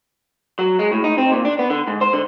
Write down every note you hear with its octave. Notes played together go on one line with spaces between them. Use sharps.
F#3
G#3
A2
D#4
C4
A#2
D4
B3
D3
G#2
C5
D3